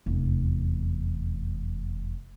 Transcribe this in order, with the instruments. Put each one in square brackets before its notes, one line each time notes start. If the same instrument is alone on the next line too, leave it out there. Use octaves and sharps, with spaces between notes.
[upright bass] F1 E2